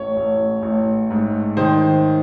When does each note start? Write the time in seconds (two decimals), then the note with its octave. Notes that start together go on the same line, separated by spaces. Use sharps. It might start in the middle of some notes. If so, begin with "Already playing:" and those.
Already playing: A1 C#5
0.17 A1
0.62 A1
1.10 G#2
1.57 D#3 C5